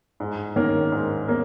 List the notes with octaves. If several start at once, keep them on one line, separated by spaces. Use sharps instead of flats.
G#2
D#3 A#3 C#4 A#4
G#2
A#3 C#4 A#4